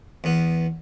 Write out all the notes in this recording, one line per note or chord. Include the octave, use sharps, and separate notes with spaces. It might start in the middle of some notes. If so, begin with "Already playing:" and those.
E2 B3